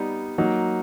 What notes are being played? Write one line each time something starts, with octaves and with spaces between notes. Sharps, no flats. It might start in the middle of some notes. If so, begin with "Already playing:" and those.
Already playing: G3 B3 D#4
F#3 A#3 D#4